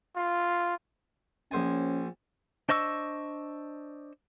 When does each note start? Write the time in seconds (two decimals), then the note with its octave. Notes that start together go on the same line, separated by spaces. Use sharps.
0.16 F4
1.51 A#1 C#4 C5 G#5
2.69 D4 C5 D#5 C#6 E6